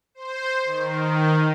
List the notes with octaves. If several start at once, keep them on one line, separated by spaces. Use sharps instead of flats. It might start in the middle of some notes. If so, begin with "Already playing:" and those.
C5
D#3